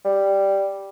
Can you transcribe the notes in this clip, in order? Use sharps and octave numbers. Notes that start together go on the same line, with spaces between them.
G3